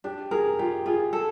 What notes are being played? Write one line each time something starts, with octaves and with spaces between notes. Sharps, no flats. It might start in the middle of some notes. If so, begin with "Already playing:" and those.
D4 G4
G#4 A#4
F4 G4
F4 G#4
A4